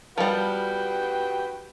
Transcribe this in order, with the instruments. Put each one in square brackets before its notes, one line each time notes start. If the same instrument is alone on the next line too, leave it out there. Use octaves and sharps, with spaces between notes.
[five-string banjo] F3 G3 [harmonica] F#4 B4 G5